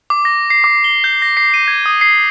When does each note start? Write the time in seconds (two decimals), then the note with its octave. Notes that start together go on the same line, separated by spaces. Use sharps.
0.10 D6
0.25 A#6
0.50 C7
0.64 D6
0.84 G7
1.04 G6
1.22 A#6
1.37 C7
1.54 D#7
1.68 G#6
1.86 D#6
2.01 C7